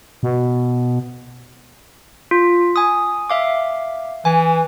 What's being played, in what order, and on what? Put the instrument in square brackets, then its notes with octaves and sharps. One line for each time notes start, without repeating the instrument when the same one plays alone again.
[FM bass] B2
[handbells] F4
G#5 D#6
E5 F5 D6
[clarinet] E3 [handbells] G#5